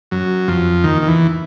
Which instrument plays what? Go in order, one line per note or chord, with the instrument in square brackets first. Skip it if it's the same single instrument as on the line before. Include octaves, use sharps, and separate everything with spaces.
[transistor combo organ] F#2 F#3
F2 F3
D#2 D#3
D#3
E2 E3